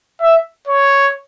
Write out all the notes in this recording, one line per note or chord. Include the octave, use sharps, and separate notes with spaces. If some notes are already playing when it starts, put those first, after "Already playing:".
E5
C#5